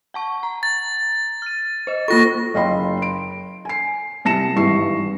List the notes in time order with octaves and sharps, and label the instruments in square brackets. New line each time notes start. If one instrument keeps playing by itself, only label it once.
[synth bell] F#5 A5 C#6
A#5
[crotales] A6
[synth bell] F6 D#7
C5 D#5
[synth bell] A#3 F4 A4 [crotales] C#6 A#6
[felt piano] F#1 D#5 F5 G5 B5 C6
D7
G#5 C7
C2 A5 A#6 C#7 E7
G#1 G2 E3 C#6 C7